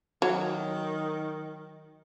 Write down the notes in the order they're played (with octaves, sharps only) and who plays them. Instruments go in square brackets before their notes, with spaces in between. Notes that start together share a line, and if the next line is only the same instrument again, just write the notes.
[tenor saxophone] D#3 [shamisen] F#3